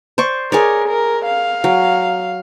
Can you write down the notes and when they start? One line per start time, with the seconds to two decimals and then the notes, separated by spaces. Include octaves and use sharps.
0.18 C5 D5 C#6
0.52 G#4 A#4 C#5 D5
0.89 A#4
1.25 F5
1.64 F#3